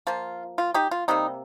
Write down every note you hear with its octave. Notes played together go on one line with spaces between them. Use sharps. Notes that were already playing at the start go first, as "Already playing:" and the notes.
F3 A#3 F4
F4
D#4 G4
F4
C3 G3 A#3 D#4